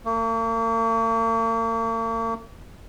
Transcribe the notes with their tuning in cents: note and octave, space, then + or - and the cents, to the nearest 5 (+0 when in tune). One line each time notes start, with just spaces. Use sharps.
A#3 -45